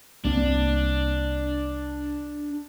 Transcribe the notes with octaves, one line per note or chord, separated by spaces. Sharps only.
C2 A#3 C4 D4